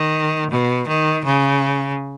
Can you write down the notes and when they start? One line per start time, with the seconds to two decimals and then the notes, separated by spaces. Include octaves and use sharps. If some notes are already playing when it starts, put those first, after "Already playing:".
Already playing: D#3
0.51 B2
0.88 D#3
1.25 C#3